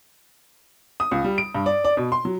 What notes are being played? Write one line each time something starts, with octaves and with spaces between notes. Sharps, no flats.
D#6
C#2
G3
D7
G2
D5
D5
B2
C6
F#3